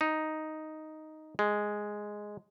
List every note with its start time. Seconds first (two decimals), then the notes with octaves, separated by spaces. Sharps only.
0.01 D#4
1.39 G#3